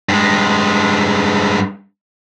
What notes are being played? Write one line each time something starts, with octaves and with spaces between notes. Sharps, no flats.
G2 G#3